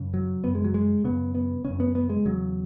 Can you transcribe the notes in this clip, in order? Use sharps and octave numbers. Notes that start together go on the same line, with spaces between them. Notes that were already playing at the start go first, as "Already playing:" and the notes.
Already playing: F#2 C#3
F#3
F#2 C#3 B3
G#3
F#3
G#3
F#2 C#3 B3
B3
F#2 C#3 C#4
B3
B3
G#3
E2 C#3 F#3